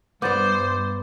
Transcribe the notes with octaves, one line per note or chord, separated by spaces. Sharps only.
G2 B3 C5 D5 D6 G6 A6